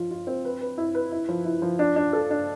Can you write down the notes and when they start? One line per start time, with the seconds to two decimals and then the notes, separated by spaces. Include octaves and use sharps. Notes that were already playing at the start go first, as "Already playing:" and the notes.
Already playing: F3 F4
0.11 F4
0.27 C4
0.45 B4
0.61 B4
0.78 E4
0.95 B4
1.12 E4
1.29 F3
1.45 E4
1.62 F3
1.79 D4
1.96 D4
2.13 A4
2.30 D4